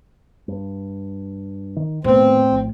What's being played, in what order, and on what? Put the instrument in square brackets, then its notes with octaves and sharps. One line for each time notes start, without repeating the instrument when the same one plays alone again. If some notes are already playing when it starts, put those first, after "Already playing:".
[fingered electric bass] G2
D#3
[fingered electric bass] D#1 B3 [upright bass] A2 [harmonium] C4
[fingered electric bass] A#1